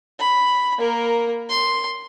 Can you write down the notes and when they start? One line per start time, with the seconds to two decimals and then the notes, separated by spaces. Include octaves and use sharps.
0.19 B5
0.79 A#3 A#4
1.49 C6